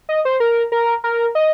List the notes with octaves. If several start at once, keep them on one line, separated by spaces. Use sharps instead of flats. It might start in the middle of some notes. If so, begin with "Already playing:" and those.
D#5
C5
A#4
A#4
A#4
D#5